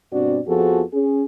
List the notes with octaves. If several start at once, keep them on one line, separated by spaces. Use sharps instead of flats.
G2 B2 C4 D4 F#4 D5
F2 F3 B3 F#4 G#4 A4
C#4 G#4